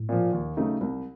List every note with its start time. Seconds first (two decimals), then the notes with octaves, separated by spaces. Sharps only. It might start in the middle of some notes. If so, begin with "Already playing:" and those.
Already playing: A2
0.09 A#2 F3
0.33 D#2
0.57 C#3 F#3 A3 D#4
0.81 C2